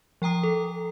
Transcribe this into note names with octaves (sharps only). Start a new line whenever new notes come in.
F3 G5 A#5 D#6 C7
A4